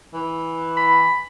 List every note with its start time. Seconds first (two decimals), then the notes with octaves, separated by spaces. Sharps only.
0.13 E3
0.77 B5